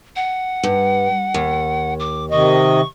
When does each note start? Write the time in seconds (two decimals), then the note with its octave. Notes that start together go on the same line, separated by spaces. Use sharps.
0.16 F#5
0.63 G2
1.34 D#2
2.00 D6
2.31 C3 D#3 D#5 C#6